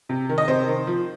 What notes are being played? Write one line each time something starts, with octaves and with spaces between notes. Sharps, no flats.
C3
D#3
D#5
C3 C5
D#3
F3